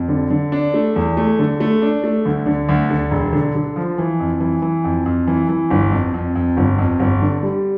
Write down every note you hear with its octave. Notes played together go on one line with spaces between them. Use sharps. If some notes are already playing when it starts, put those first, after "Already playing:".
Already playing: F2
D3
D3
D4
A3
E2
A3
D3
A3
D4
A3
D2
D3
D2
D3
E1
D3
D3
F3
E3
F2
E3
E3
F2
F2
E3
E3
G1
F2
F2
F2
G1
F2
G1
D3
G3